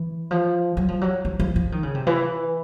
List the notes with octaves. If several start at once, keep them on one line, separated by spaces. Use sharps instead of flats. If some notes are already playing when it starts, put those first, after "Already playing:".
Already playing: E3
F3
F#3
F3
F#3
F3
F3
F3
D#3
C#3
C3
E3